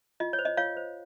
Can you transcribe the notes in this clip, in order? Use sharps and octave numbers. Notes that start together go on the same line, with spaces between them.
F4 D#5
C#5
C5
D#5
F4 C#5 F5
C5